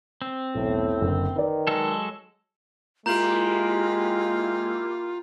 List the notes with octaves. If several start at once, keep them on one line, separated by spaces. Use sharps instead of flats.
C4
B1 E2 A2
F#1 D3
D#3 B4 D5
F#3 G#3 A4
G#3 A#3 E4 F4 G4 A#5 G6 F#7